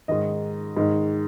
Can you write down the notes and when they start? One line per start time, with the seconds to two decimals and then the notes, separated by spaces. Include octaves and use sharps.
0.08 G#2 D#3 D#5
0.77 G#2 D#3